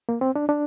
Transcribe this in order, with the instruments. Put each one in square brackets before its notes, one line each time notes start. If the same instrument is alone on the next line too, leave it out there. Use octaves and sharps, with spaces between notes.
[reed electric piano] A#3
C4
D4
D4